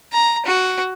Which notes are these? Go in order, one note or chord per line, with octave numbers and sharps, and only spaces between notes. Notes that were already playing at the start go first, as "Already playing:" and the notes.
A#5
F#4